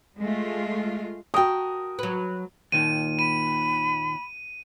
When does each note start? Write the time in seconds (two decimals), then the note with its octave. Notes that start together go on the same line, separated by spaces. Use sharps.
0.19 G#3 A3 F4
1.34 F#4 A#4 G5 A5 D#6
1.99 F#3 B4
2.72 D#2 A#2 D#3 D#7
3.19 B5 D#7